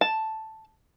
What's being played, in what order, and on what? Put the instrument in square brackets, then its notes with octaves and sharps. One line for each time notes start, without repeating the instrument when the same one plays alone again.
[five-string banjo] A5